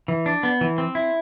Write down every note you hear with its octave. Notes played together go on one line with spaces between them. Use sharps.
E3
D4
B3
E3
C4
E4